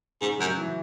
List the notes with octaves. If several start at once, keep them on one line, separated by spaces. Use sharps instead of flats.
G#2 C#3
F#2 F#3
E3